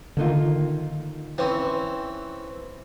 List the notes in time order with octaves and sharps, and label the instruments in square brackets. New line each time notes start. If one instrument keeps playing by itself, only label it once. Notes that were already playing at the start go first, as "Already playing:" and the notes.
[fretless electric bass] D3 D#3 [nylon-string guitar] A#3 D#4 F4
[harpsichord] E3 C4 C#4